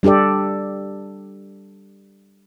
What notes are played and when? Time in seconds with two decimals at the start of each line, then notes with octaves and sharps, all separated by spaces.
0.03 G3 D4 G4 A4 D5